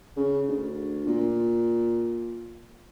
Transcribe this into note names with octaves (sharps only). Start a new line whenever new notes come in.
C#3
D2
A#2